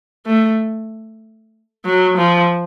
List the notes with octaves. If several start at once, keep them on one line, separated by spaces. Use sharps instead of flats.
A3
F#3
F3